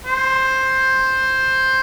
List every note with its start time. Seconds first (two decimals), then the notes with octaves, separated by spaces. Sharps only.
0.06 C5